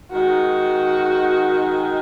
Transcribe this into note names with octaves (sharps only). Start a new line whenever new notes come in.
D#3 G#3 D#4 F#4